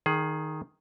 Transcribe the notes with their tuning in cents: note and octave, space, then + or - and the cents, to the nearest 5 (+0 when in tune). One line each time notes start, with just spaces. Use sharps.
D#3 +0 G#4 +20